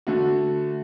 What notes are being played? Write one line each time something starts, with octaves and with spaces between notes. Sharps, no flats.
D3 A3 F#4